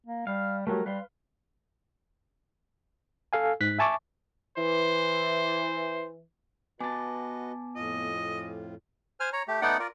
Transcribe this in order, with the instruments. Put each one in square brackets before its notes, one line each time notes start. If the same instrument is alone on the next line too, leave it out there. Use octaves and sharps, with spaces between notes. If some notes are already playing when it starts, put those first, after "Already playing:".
[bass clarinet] A#3
[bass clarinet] G3 [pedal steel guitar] F5
[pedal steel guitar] F#3 G3 A3 [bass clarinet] A#4
[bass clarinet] G3 [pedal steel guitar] B4 F5 C6
[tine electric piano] A4 F5 G#5
G#2 F#6 B6
E5 G#5 A5 C#6 D6
[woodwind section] E3 [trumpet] C5
[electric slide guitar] B3 A5 [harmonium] F#4 B4 D#5 [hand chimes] G#5 D6
[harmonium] F2 A2 F4 [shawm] D#5
[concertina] C5 G#5 F6
C#5 A#5
A3 G4
A3 B3 D#4 D5 F#5 G5
F4 A#4 D5